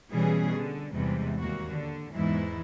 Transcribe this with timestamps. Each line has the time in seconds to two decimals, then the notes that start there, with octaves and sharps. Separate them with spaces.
0.12 B2 E3 G3 C#4 G#4
0.56 D3
0.94 E2 G#2 C3 E3 G3
1.41 D#2 A#3 F#4
1.70 D3
2.14 E2 G#2 E3 E4